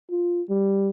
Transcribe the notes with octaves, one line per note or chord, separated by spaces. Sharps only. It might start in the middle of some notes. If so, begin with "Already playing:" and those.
F4
G3